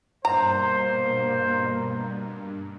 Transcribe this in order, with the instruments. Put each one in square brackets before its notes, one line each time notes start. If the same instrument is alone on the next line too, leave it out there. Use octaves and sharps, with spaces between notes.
[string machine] G2 [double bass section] B2 A#3 [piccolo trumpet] C5 [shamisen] A#5